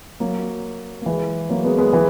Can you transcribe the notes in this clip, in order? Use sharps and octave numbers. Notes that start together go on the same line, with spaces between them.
F#3 A#3
A#3
E3 G#3
F#3 A#3
G#3 B3
G#3 B3
E3 G#3